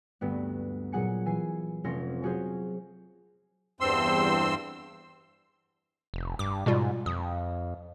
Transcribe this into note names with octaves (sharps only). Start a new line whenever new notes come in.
D2 G2 B3
A#2 F#3 G#4 F#5 G#5 C#7
E3 G#5 C7
F1 F2 C#4 C6 A#6
F#3 C#4 F#4 G#4 C5
E2 G2 C4 C6 E6
F1
G2 D6
G#2 B2 G3 F4
F2 D#6